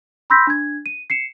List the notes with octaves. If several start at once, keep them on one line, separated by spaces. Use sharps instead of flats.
B5 C6 E6 G6 A#6 B6
D4 G#6
D#7
C7 C#7 E7